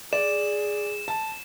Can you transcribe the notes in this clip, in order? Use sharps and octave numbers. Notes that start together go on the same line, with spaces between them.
G#4 D5 E7
A5